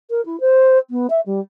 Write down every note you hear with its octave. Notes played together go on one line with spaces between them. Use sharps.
A#4
E4
C5
B3
E5
G3